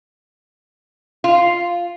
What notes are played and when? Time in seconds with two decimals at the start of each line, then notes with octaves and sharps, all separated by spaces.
1.24 F4